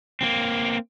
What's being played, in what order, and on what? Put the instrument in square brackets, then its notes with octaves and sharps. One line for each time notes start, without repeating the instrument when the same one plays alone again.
[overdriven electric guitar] A#3 C4